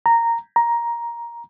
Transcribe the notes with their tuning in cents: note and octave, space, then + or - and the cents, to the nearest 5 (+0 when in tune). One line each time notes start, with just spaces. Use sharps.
A#5 -10
A#5 +10